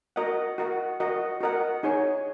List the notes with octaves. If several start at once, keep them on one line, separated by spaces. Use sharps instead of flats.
F#4 A#4 D#5 F#5
F#4 A#4 D#5 F#5
F#4 A#4 D#5 F#5
F#4 A#4 D#5 F#5
D#4 G#4 C#5